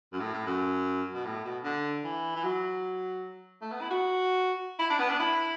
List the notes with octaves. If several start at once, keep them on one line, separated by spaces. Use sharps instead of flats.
F#2
A2
A2
F#2
B2
A2
B2
D3
E3
E3
F#3
A3
B3
E4
F#4
E4
D4
B3
D4
E4